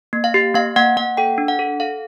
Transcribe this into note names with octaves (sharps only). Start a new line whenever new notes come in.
A#3
F5
G4
A#3 F5
A#3 F#5
A#3 F#5
A4 G5
D4
F#5
A4
A4 F5